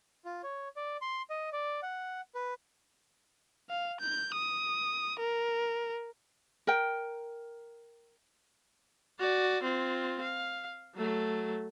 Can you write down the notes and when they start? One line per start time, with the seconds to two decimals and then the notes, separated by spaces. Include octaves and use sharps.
0.25 F4
0.43 C#5
0.76 D5
1.01 C6
1.30 D#5
1.53 D5
1.83 F#5
2.35 B4
3.70 F5
4.00 G6
4.35 D#6
5.19 A#4
6.67 A#4 G5
9.19 F#4 D5
9.63 C4 F4
10.21 F5
10.96 F#3 A3